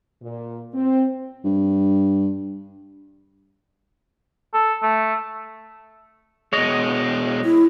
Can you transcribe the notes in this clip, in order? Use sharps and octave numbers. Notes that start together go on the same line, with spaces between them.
A#2
C4
G2
A4
A3
B2 G#3 C#5 D#5
E4